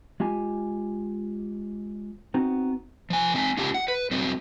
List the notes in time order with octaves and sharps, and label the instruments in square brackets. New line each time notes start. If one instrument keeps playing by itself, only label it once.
[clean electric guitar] G#3 F4 G4 G#5
B3 C4 D#4 F#4
[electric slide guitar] F3 G#5
C4 G#5 A5
C#4 F4 G4 A5
F#5
B4
F#3 G3 C4